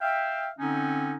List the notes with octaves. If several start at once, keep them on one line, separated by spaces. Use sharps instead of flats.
E5 F5 G5
D3 C4 C#4 D#4